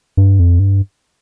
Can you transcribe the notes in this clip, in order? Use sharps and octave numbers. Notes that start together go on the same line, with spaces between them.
G2
F2
G2